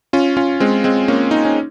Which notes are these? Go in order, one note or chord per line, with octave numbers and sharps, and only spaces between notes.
C#4 F4
C#4 F4
G#3 C4
G#3 C4
A#3 C#4
D#4
C#4